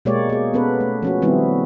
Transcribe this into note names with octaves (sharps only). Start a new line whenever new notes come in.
B2 G#3 A#3 G4 C#5 D5
A#3 G#4
B3 C#4 A4 B4
A3
F3 C#4 F#4
D#3 G3 B3 C4 E4